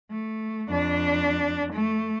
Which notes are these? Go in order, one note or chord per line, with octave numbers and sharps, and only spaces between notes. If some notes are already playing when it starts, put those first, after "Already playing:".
A3
F2 D4
A3